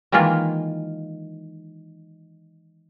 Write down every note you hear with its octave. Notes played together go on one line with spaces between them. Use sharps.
D#3 E3 G#3 A#3 F4